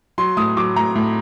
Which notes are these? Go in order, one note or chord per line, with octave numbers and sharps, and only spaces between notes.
F#3 C6
A2 D#6
F#3 D6
A2 A#5
A2